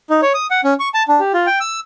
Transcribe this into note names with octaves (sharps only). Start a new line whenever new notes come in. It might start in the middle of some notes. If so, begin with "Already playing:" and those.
D#4
C#5
D#6
F#5
C#4
C#6
A5
D4
G4
F4
G5
E6